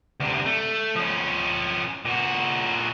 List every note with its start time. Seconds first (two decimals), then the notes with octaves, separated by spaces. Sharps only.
0.20 D2 C3
0.46 A3
0.96 F3 C#4
2.05 A#2 F#4